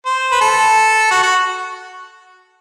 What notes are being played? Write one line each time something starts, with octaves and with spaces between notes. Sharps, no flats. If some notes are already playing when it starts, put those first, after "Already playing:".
C5
B4
A4
F#4
F#4